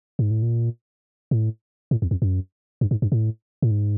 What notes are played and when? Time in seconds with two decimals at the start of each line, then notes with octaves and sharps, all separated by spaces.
0.19 G#2
0.31 A2
0.42 A#2
1.31 A2
1.91 A2
2.02 E2
2.11 F2
2.22 F#2
2.81 G2
2.91 G#2
3.02 G2
3.12 A2
3.62 A2
3.71 G#2